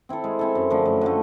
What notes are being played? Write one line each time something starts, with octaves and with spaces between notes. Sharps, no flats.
C4 E4 A4
G#3
C4 E4 A4
F#2
D3 F3 A3
F#2
D3 F3 A3